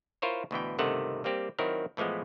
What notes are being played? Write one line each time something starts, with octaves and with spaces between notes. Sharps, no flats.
E4 F4 A#4 C5 C#5
D2 B2 E3 G5
C#2 G2 C3 D#3 A3 F#5
G3 A#3 C4 G4
D#3 F#3 C4 E4 A#4
A2 E3 F3 G#3 B3